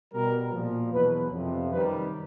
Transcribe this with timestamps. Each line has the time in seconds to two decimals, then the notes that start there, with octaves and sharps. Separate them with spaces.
0.13 B2 G3 A#4
0.52 A#2 F3
0.92 E2 B2 F#3 B4
1.31 F2 C3 F3
1.71 F#2 D#3 G3 B4